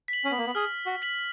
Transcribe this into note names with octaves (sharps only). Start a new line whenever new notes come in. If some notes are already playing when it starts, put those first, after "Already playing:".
B6
F#7
C#4
B3
A#3
B3
G#4 F6
F#4
B6 F#7